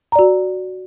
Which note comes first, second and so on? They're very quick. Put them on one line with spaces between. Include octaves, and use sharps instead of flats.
A#5 D5 F#4